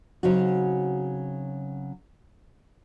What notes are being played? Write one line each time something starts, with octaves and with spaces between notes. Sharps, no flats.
C#3 F#3 C4 D#4 F#4